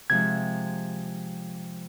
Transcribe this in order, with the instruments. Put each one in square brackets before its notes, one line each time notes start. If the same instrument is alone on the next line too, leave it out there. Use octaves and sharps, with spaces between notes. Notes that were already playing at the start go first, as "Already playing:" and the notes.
[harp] C3 F3 G#3 [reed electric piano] G#6